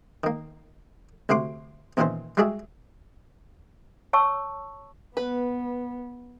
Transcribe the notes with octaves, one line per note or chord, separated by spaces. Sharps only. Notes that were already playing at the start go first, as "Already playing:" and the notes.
D#3 A#3
D2 C3 A3 F#4 C6 D6
E2 A#2 D#3 E3 C#4 C5
G3 G#3 F#4 G#4 D5 E5
C#5 A5 C#6 E6
B3 B4